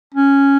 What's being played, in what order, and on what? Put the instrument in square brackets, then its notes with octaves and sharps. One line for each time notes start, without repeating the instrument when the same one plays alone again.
[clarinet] C#4